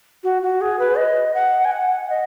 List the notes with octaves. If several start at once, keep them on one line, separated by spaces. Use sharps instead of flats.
F#4
F#4
G#4
B4
D#5
F#5
G#5
F#5
D#5